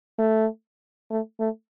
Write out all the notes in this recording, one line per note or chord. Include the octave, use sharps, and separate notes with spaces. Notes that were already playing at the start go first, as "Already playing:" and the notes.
A3
A3
A3